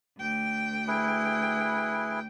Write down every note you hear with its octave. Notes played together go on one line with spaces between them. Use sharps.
D2 G5
E4 G#4 B4